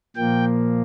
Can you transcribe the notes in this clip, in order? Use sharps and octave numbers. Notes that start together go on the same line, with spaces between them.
A#2 F3 A#3 G5